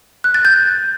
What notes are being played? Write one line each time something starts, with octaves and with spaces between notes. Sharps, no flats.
F#6
A6
G6